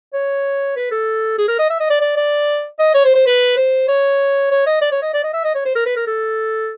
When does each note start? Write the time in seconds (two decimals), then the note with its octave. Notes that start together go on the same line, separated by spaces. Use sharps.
0.14 C#5
0.76 B4
0.91 A4
1.38 G#4
1.48 A#4
1.59 D#5
1.70 E5
1.80 D#5
1.90 D5
2.01 D5
2.17 D5
2.79 D#5
2.94 C#5
3.05 C5
3.15 C5
3.26 B4
3.57 C5
3.88 C#5
4.51 C#5
4.66 D#5
4.81 D5
4.92 C#5
5.02 D#5
5.14 D5
5.24 D#5
5.34 E5
5.44 D#5
5.55 C#5
5.66 C5
5.75 A#4
5.86 B4
5.97 A#4
6.07 A4